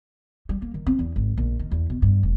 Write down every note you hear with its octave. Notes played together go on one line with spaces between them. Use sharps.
G3
A#3
D#3
C4
E2
G#1
A#1
D#3
E2
B2
G2
F1